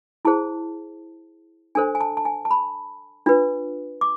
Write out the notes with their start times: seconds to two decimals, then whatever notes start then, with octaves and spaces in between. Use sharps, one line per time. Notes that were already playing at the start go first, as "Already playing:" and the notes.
0.25 E4 G#4 C5 A5
1.75 D4 A4 C5 G#5
1.95 G#5
2.01 A5
2.17 A5
2.25 G#5
2.45 A5
2.51 B5
3.26 D4 F4 B4
4.01 D6